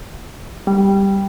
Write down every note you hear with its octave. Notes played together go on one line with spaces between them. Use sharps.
G3